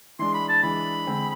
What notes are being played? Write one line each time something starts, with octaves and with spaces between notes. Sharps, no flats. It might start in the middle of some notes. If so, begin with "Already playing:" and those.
E3 G#3 D4 C6
B5
A5
E3 G#3 D4 B5
D3 G#3 C4 G#4